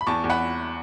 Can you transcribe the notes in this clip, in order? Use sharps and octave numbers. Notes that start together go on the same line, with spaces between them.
B5
E2 A5 C#6
E2
F#5 B5